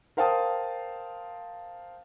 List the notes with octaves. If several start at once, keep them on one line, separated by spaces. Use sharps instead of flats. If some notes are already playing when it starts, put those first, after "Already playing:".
A#4 C5 F5 G5 A5 D#6